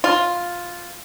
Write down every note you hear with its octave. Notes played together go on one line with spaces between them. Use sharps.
F4